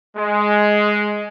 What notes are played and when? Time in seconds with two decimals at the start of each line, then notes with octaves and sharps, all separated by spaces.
0.17 G#3